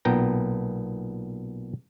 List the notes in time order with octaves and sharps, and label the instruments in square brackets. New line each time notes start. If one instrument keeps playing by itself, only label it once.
[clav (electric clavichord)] B1 A#2 B3 G5 A#5